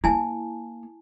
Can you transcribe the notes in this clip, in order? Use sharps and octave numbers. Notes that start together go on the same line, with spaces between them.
A#3 E4 G#5 A5